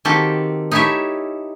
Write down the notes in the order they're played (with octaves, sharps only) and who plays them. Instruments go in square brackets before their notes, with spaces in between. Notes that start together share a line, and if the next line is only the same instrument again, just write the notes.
[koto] D#3 A#3 C4 F#4 G4 A4
D#4 E4 G4 A4 C#5 E5